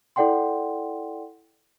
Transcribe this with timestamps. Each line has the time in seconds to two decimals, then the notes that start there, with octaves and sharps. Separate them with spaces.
0.16 E4 A4 D5 F#5 G5 C6